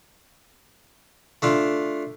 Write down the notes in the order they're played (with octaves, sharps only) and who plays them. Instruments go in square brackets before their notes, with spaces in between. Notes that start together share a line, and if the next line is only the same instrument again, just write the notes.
[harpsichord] A3 D4 F4